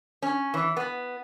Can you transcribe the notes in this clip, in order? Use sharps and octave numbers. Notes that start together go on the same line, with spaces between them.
C#4
E3
B3